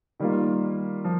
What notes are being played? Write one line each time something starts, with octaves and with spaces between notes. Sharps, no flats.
D#3 G3 A#3 F4
F3